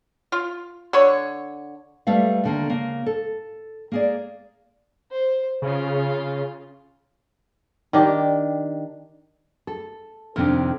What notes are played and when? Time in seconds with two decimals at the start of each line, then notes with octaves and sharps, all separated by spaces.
0.32 F4
0.93 D3 C#5
2.07 G3 A3 B4 F5
2.44 D#2 D3 A#3
2.70 C#3 A#3
3.06 A4
3.92 A#3 G#4 D5
5.11 C5
5.62 C#3 C#4 F4
7.93 D#3 D4 G4
9.67 A4
10.36 F2 C3 D#3 C4 D4